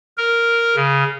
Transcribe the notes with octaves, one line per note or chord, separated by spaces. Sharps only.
A#4
C#3